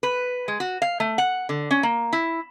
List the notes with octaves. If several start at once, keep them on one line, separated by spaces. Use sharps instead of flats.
B4
G#3
F#4
F5
A3
F#5
D3
C#4
A#3
E4